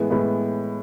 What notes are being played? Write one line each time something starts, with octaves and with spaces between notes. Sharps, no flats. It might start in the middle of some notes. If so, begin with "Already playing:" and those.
Already playing: A2 E3 G#3 B3
A2 E3 G#3 B3